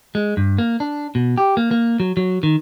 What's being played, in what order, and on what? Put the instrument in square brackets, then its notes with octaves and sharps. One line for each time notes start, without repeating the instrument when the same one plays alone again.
[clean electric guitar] G#3
G2
A#3
D4
B2
G4
A#3
A#3
F#3
F#3
D#3